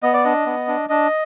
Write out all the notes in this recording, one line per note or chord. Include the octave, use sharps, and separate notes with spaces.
B3 D#5
D5
D4 D#5
B3
D4
D4 D#5